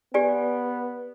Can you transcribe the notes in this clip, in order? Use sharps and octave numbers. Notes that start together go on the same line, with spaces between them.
B3 G4 D5 G#5